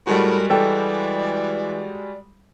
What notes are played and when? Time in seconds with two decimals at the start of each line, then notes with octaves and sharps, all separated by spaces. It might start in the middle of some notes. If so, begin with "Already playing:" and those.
0.07 A2 G3 G#3 F#4 A#4
0.50 E3 A4 D5 G5